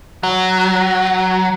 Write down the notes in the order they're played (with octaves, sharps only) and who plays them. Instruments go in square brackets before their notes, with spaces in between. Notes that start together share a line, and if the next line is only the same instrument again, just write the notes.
[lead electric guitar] F#3